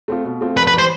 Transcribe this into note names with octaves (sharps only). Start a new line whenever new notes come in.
A3 C4 F4
B2
A3 C4 F4
F1 B4
B4
E3 G3 C5